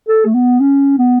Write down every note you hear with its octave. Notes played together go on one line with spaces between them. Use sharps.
A4
A3
B3
C#4
B3